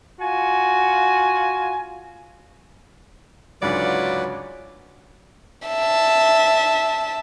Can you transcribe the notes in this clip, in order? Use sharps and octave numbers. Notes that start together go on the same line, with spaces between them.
F4 F#4 G#5
C#2 G#2 D3 F#3 F4 B4 D5 F#5
E5 A5